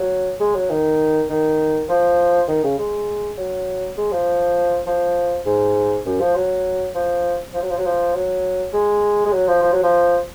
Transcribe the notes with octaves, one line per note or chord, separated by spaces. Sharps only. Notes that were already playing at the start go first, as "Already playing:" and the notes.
Already playing: F#3
G#3
F#3
D#3
D#3
F3
D#3
C#3
G#3
F#3
G#3
F3
F3
G#2
F#2
F3
F#3
F3
F3
F#3
F3
F#3
F3
F#3
G#3
G#3
F#3
F3
F3
F#3
F3